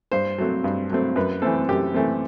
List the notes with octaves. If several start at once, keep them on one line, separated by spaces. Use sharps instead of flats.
G2 C5
F#3 A3 C4
G2
F#3 A3 C4
F#2 B4
E3 A3 C4 A4
F#2 G4
E3 A3 C4